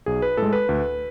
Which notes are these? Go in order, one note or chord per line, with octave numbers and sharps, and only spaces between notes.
B1 G#4
B4
A2 G#3 A4
B4
D2